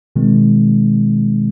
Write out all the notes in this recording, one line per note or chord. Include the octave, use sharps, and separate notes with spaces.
B2 D#3 G#3 C4